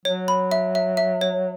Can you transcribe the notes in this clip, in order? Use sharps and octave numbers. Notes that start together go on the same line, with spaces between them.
F#3 C#5
B5
E5
E5
E5
C#5